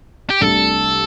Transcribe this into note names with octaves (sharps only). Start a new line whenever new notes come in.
G4
C2 C3 A3 D4 A4